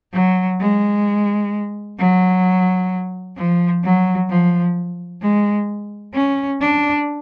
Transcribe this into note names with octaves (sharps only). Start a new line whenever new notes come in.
F#3
G#3
F#3
F3
F#3
F3
G#3
C#4
D4